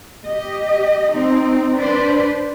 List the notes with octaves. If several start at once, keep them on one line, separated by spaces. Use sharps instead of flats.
G4 D#5
C4 D#4
D4 B4 C5 D5